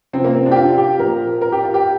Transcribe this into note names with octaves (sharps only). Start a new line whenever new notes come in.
C3 F3 C4
A#3
C4
D4
G4
F4
G4
A#2 F3 A#4
A#4
G4
F4
G4